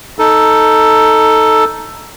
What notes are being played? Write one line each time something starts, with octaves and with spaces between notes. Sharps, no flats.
D#4 A4